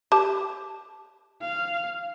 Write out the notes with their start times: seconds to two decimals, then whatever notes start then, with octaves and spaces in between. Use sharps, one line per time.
0.12 G4 A5
1.41 F5